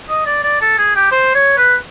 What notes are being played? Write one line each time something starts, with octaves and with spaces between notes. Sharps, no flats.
D#5
D5
D5
A4
G#4
G4
C5
C#5
B4